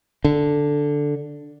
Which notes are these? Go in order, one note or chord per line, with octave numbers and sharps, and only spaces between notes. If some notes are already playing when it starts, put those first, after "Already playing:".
D3